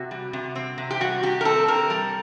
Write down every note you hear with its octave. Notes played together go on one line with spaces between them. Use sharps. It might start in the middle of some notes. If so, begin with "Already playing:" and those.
Already playing: C3 F#4
G3
C3
C4
C3
G4
G3 F#4
C3 G4
A#4
C4 A4
C3 A#4
G3